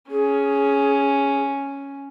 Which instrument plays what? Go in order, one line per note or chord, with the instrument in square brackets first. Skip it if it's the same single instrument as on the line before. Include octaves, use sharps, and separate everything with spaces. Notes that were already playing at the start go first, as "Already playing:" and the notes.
[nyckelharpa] C#4 [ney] G#4